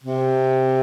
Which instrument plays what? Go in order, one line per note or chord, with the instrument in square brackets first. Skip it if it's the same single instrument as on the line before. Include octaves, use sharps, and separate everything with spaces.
[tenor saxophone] C3